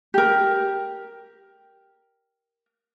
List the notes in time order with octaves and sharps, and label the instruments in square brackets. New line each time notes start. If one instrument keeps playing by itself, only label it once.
[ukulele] G4 A#4